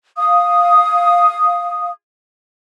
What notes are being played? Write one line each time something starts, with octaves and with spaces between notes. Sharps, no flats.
F5 D#6